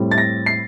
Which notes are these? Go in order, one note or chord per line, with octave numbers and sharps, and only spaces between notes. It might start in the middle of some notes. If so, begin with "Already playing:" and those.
Already playing: A2 G3 C4
A6
A#6
C7